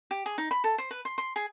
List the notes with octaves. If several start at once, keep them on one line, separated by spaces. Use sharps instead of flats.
G4
G#4
D#4
B5
A4
C5
B4
C6
C6
G#4